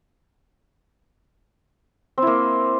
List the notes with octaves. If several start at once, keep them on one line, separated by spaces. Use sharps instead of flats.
A#3 C4 E4